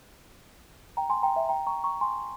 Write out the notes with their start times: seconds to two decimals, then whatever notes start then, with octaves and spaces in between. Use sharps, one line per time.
0.97 G5 A#5
1.10 G#5 C6
1.23 G5 A#5
1.36 E5 G5
1.49 G5 A#5
1.67 A#5 C#6
1.84 A#5 C#6
2.01 G#5 C6